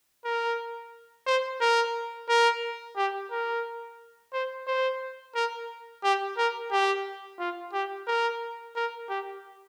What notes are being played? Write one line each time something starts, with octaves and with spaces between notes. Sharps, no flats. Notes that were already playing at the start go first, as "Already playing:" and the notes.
A#4
C5
A#4
A#4
G4
A#4
C5
C5
A#4
G4
A#4
G4
F4
G4
A#4
A#4
G4